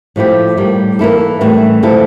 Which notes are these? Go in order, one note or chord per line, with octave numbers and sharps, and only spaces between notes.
A2 F3 A3 E4 G4
A2 G3 A#3
E3 A#3 E4 A4
A2 E3 G3 C#4
D3 F3 A3 E4 A4